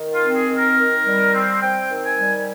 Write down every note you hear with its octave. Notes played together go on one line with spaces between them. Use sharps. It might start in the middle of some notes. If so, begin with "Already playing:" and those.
Already playing: D#3
F4
C4
G#4
D#3
A#4
D#3
G3
C4
C4 G5
D#3
G#5
G3